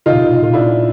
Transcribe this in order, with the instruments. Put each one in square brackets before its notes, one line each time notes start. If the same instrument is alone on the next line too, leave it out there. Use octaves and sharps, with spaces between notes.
[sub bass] C#3 [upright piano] D#4 F4
[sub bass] B2
C3
B2
[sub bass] A#2 [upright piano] F4
[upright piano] D4 E4